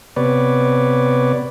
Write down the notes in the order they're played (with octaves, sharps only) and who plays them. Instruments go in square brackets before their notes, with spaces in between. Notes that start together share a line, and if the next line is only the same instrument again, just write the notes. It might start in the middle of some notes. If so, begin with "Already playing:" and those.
[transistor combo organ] C3 B3 B4 C#5 D5